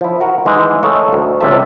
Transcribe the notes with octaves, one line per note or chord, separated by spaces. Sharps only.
F3 E4
F#4 A#4 F#5
E3 G#3 D#4
A3 A4 A#4 C#5 D#5 F5
D2
C#2 C3 A#3 E5 A5